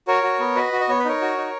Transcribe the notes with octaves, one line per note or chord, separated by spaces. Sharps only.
F#4 A#4 C#5
F#4
B3
F#4 B4 D#5
F#4
D#5
B3 C#5
B4
D#4 A#4 C#5
F#4
D#4